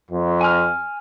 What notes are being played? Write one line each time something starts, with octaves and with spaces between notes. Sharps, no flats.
F2
G#5 F6